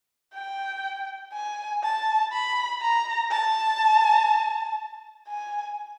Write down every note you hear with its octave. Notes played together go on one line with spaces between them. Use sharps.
G5
G#5
A5
B5
A#5
A5
G#5